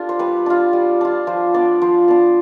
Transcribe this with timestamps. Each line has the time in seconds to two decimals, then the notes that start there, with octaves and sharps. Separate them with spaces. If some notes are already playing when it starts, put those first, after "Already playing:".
Already playing: D4 F4 G4 A4
0.09 C5
0.19 G3 B4
0.46 D4 F4
0.73 G3
1.01 D4 F4
1.27 F3 C5
1.54 B3 D4 D5
1.82 F3 C5
2.08 B3 D4